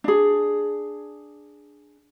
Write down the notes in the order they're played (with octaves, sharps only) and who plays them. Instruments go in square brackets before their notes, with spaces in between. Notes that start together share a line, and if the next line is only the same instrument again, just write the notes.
[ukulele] D4 G#4